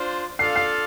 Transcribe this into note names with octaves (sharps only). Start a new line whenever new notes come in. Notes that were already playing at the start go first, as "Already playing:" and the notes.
Already playing: D4 F4 C5
D4 F4 A4 D5 F5 C7
C7